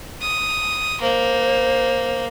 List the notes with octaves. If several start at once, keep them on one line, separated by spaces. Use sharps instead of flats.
D#6
A#3 C5